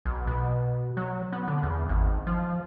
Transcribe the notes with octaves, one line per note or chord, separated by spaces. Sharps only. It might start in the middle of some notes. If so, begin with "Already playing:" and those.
B1
B2
F#3
B3
D3
E2
G#1
F3